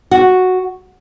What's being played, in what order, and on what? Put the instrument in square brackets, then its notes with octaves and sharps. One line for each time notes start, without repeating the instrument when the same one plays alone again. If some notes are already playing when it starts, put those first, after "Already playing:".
[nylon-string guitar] F#4